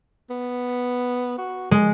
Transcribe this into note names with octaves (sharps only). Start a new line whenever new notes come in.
B3
F#4
G#3 D#5